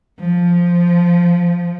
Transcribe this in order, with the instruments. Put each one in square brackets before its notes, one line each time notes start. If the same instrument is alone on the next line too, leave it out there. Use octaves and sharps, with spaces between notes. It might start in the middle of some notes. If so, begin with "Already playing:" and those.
[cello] F3